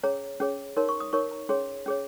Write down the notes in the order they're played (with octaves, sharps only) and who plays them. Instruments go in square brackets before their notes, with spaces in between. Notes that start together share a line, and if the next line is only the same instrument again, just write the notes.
[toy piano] C#4 G#4 C#5 A#5
C#4 G#4 C#5
D#4 A#4 C#5 C6
C#6
D#6
D#4 A#4 C#5 C#6
A#5
C#4 G#4 C#5 C6
C#4 G#4 C#5